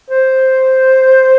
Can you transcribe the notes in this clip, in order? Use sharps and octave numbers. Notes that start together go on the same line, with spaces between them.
C5